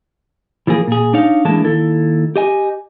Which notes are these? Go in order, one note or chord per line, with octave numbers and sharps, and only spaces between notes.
E3 F3 A#3 G#4
A#2 G#4
D4 D#4 C#5 F5
A2 E3 G#3 A#3 D4 A5
D#2 E4 A4
G4 D#5 G#5